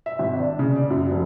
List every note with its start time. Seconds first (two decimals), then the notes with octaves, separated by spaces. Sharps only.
0.06 E5
0.19 G#1
0.39 D4
0.59 C#3
0.76 D5
0.90 F#2
1.11 F1